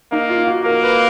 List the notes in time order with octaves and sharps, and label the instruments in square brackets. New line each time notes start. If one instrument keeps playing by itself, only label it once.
[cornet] A#3 [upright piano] D#4
[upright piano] F4
F#4
[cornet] A#3 [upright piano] A#4
[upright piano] B4